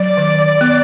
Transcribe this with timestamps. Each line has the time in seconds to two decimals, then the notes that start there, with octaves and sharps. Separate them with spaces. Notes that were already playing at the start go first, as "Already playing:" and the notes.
Already playing: F#3 D5
0.17 D#3
0.61 B3